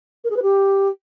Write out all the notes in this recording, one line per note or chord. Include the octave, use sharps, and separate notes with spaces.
A#4
G#4
B4
G4